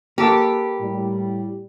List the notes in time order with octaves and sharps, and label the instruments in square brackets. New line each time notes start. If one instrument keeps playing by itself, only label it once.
[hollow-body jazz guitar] A#3 A4 B4 [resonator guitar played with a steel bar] G4
[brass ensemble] A2 G3